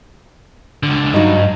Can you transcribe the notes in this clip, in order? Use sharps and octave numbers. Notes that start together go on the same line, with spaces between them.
C#2 D3
G2 F#3 D#4